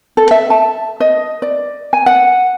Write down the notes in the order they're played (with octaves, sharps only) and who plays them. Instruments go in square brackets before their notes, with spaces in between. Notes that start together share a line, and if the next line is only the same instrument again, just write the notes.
[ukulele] A4
E5
A5
D#5
D5
G#5
F#5